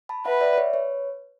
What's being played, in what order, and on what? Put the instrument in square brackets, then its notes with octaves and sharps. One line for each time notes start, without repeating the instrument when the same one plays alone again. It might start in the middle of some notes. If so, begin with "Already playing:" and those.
[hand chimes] A5 B5
[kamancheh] B4 [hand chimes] E5 F#5
[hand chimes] D5 E5
B4 C#5
B4 C#5